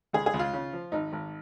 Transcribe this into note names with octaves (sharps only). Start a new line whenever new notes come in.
C#2 G#4
G#4
C#2
F4
C#3
F3
G#1 D#4
G#1